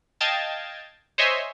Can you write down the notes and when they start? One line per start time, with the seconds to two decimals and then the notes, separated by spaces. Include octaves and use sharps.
0.21 D#5 F5 G5 A5 G#6 A6
1.18 C5 C#5 D#5 E5 G#5 C6